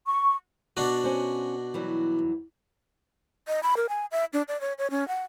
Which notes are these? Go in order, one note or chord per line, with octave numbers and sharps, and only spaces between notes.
C#6
B2 D4 F#4 D5
C#4 C5
E3 F#3 G3
D#5
B5
A#4
G#5
E5
D4
D5
C#5
C#5
C#4
F#5